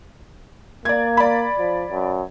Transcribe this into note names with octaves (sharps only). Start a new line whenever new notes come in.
A#3 D5 G#6
D5 B5
F3
F#2